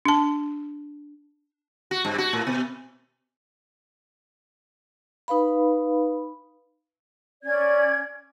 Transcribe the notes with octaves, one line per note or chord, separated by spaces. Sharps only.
D4 A5
F#4
G2
F#4
A2
B2
D#4 B4 F5 B5
C#4 D5 G#6